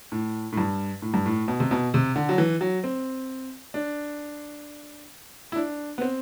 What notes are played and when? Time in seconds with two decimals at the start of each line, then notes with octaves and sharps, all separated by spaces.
0.12 A2
0.52 A2
0.58 G2
1.02 A2
1.14 G2
1.26 A2
1.48 B2
1.60 C3
1.71 B2
1.94 C3
2.16 D3
2.29 F#3
2.38 E3
2.61 F#3
2.84 C4
3.74 D4
5.52 E4
5.56 D4
5.98 B3
6.01 C4